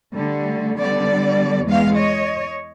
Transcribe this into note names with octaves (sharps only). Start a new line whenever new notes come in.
D3 G3 A3
D3 G3 B3 D5
E2 G#3 B3 F5
C#5 D#5